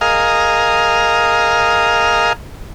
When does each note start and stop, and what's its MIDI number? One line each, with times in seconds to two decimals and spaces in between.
0.01 2.33 68
0.01 2.33 70
0.01 2.33 75
0.01 2.33 77